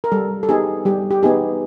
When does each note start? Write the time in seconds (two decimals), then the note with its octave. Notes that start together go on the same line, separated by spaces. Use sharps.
0.04 A#4
0.12 G3 A4
0.43 A4
0.49 B3 D#4 G4 G#4
0.85 G3 G4
1.11 G4
1.22 B3 D#4 G4 G#4